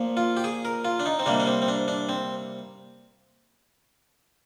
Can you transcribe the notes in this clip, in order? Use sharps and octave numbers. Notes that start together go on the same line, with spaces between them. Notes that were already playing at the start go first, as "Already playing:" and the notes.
Already playing: A#2 F3 A#3
F4
G4
G#4
A#4
F4
D4
D#4
C4
C3 G3 A#3 D4
D4
C4
C4
D4
D4
C4